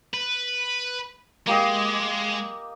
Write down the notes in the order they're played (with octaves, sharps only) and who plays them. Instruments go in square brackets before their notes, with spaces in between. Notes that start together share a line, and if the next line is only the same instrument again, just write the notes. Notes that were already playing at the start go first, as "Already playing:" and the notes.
[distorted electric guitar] B4
[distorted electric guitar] G#3 [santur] A#3 G4 D#5